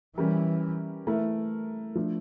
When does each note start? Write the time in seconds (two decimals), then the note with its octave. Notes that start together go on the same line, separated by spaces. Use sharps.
0.17 E3 G3 C#4 G4 A#4
1.07 E3 A3 E4 A#4
1.95 F3 A3 D4 A4